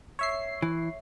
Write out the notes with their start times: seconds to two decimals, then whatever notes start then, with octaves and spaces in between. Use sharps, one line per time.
0.19 C#5 E5 C7
0.62 E3